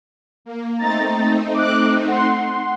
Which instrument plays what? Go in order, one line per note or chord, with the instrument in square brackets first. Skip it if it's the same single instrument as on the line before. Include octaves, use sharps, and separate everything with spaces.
[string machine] A#3
[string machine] A3 C4 D#4 [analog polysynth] A#5 A6
[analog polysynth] D6 F#6
F#5 C6